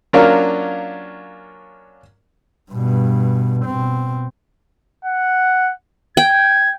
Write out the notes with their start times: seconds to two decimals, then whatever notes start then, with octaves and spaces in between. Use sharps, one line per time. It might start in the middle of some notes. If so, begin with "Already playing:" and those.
0.13 F#3 A#3 C#4 D4 F4 A#4
2.71 G2 B2
3.66 B2 C4
5.05 F#5
6.17 G5 G#6